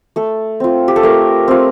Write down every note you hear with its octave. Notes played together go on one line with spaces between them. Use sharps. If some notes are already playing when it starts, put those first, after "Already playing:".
A3 A4
C4 F4
G4
A4
A3 A#4
C4 F4